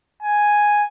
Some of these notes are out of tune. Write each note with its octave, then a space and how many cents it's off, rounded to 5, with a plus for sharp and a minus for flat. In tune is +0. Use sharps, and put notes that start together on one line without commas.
G#5 +0